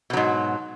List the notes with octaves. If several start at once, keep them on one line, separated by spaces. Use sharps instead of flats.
G#2 B2 F#3